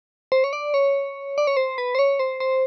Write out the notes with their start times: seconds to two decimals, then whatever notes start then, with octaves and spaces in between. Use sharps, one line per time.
0.32 C5
0.44 C#5
0.53 D5
0.74 C#5
1.38 D5
1.47 C#5
1.57 C5
1.78 B4
1.95 C5
1.99 C#5
2.19 C5
2.40 C5